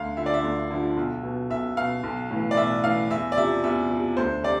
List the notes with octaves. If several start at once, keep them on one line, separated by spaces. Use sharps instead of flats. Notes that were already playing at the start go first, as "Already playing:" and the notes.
Already playing: D2 F5
D3 F3 E5
D5
E5
D2
D3 F3
B1
B2
B1 E5
B2 F5
B1
A2 E3
D5
B1 E5
A2 E3 F5
E2 E5
D5
C3 F3 E5
E2 E5
C3 F3
D2 C5
C3 D5